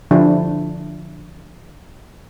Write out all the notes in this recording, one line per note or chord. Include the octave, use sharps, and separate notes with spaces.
D3 F3 D4 E4